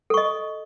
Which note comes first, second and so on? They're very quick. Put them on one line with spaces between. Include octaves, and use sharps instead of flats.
A4 C#6 D#5